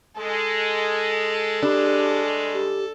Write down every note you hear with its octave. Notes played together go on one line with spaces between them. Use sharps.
G#3 A4
G2 C#3 G#3 D4 G4
G4